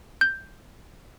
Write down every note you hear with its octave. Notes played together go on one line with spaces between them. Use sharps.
G6